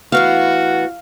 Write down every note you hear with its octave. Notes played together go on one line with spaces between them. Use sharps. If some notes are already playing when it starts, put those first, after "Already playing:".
A2 E3 B3 F#4 F5